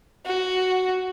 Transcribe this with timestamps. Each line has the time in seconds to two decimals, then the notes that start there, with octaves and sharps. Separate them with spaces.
0.26 F#4